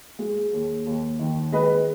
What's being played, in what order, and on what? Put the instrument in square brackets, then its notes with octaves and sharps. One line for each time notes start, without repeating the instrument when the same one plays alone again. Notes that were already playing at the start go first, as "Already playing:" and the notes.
[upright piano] G#3
D#2
D#2
D#3
G#3 B4 D#5